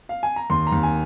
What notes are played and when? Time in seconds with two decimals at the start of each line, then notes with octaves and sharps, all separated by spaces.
0.09 F5
0.23 G#5
0.36 A#5
0.50 D#2 C6
0.67 A#5
0.72 D#2
0.83 G#5